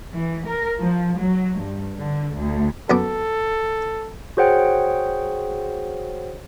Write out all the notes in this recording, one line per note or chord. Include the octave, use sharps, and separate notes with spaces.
E3
A#4
F3
F#3
G2
D3
D2
F#2 B3 A4 D6
F#4 G#4 C5 C#5 F#5 G5